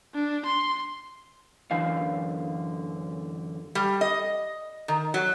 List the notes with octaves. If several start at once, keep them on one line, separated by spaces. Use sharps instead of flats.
D4
C6
F#2 D3 E3 F5
G3
D#5
D#3
F#3